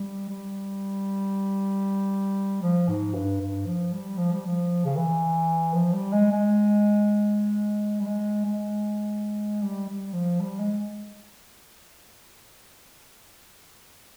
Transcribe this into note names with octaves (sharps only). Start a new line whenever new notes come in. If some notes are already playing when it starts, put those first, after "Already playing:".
Already playing: G3
G3
F3
G#2
G2
G2
F3
G3
F3
G3
F3
C#3
E3
F3
G3
G#3
G#3
G3
G#3
G#3
G3
G3
F3
G3
G#3